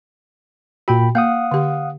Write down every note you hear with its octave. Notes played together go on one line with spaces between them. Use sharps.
A#2 F#4 G5 B5
A#3 F5 F#5 D#6
D3 G4